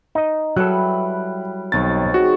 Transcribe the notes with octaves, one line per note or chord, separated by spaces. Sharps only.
D#4 D#5
F#3 G3 E4 A4 B4 F#6
B1 D#3 C4 C#5 A6
F#4 G#4